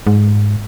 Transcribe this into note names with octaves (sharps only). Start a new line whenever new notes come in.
G#2